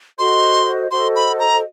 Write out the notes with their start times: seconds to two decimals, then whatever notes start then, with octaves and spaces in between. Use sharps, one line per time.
0.18 F#4 A4 C5 D#5 C6
0.91 F#4 A4 C5 D#5 C6
1.16 B5
1.40 A#5